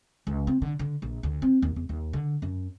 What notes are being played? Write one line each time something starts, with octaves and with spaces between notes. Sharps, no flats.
C#2
C4
D3
D3
A#1
D2
C4
D#2
E2
D#2
D3
F#2